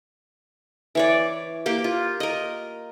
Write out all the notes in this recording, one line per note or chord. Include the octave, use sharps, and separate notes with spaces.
E3 C#5 D5
A#3 G4
F4
A#4 D#5